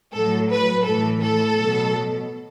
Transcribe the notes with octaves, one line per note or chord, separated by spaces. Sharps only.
A2 F#3 A4
B4
A2 E3 A4
A4
B2 F#3